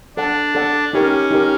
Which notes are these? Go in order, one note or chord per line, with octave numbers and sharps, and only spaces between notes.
D4 A4 D5 F#5 A5
A4 D5 F#5 A5
C#4 D#4 G4 A#4
D#4 G4 A#4